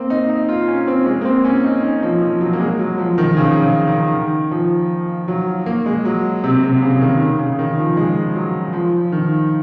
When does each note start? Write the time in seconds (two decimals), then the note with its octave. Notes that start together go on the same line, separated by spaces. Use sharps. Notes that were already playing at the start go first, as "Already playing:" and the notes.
Already playing: A#3 C4
0.10 D#4
0.30 D#4
0.49 F4
0.68 C#4
0.87 C4
1.06 G#3
1.21 A#3
1.25 C4
1.44 C#4
1.64 D#4
1.83 C#4
2.02 F3
2.22 F3
2.41 F#3
2.53 A#3
2.60 G#3
2.79 F#3
2.98 F3
3.18 D#3
3.37 C#3
3.62 C#3
3.87 D#3
4.13 D#3
4.51 F3
5.28 F#3
5.66 A#3
5.86 G#3
6.05 F#3
6.44 C3
6.63 C3
6.82 C#3
6.96 C#3
7.01 D#3
7.20 C#3
7.39 C#3
7.59 D#3
7.78 F3
7.97 G#3
8.35 F#3
8.73 F3
9.12 D#3